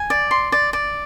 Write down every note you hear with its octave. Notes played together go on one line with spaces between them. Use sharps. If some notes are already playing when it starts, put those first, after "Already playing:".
Already playing: G#5
D5
C6
D5
D5